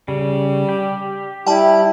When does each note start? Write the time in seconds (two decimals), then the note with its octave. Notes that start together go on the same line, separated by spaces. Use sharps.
0.08 C#3 G3
0.69 G4
1.47 G3 E4 G5 A5